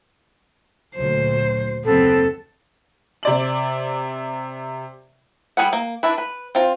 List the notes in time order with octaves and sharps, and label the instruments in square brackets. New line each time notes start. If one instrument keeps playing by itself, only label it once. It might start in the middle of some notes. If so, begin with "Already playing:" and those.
[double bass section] D2 A#2 F#3 [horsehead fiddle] C5
[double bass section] F#1 D#2 [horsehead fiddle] B3 C4 [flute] A4
[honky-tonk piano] C3 D5 F#7
[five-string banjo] G3 G#4 B4 F#5
A#3
D4 E4 B4
B4
C4 F4